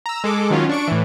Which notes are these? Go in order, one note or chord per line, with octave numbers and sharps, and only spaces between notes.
A#5 E6
G#3 A4 D6
D#3 F#3 C#4 F4
D4 C#6 D7
A2 E3